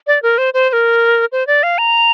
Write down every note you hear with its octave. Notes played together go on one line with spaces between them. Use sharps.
D5
A#4
C5
C5
C5
A#4
C5
D5
F5
A#5